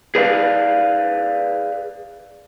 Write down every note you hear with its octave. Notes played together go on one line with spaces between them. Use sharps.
G#4 B4 D5 F5